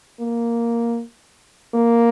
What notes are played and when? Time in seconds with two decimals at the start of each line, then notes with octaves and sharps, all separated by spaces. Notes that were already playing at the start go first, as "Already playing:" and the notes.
0.20 A#3
1.74 A#3